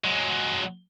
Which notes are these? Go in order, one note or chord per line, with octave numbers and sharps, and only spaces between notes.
F#3 G#3